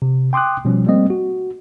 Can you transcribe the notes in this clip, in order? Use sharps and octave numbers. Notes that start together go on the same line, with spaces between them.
C3
G5 C6 D6 D#6 F#6
B2 F3 G3 C#4
G3 A3 A#3 C4 D#5
F#4